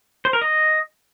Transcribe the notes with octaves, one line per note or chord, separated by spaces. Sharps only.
C5
A#4
D#5